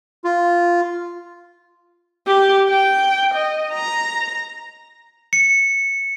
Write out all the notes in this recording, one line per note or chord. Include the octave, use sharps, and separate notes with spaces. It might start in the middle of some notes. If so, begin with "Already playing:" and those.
F4
G4
G5
D#5
A#5
C#7